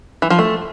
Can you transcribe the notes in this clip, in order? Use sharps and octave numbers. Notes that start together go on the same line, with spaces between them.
E3
F3
A3